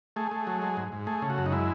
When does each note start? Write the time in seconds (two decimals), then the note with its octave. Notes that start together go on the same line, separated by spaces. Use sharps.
0.16 A3 G#4
0.31 A3
0.47 F#3
0.62 G#3
0.77 G#2
0.92 G#2
1.07 A3 G#4
1.22 C#3
1.30 F#4
1.38 F#2
1.46 D#4
1.52 G#3 E4